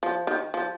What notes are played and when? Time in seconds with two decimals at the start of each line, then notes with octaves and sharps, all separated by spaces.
0.03 F3
0.27 D#3
0.54 F3